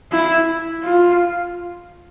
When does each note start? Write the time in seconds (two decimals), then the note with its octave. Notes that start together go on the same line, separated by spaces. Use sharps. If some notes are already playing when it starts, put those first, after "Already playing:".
0.12 E4
0.83 F4